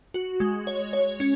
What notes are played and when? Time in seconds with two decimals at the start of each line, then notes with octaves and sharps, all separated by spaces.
0.14 F#4
0.40 G#3
0.67 C#5
0.93 C#5
1.20 C#4